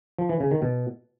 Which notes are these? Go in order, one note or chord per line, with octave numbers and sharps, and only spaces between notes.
F3
E3
C#3
D#3
B2